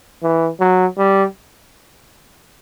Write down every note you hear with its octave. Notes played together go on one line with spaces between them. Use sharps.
E3
F#3
G3